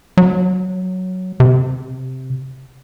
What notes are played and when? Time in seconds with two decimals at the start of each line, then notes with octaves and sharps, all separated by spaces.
0.17 F#3
1.40 C3